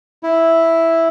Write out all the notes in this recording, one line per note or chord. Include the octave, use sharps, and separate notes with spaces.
E4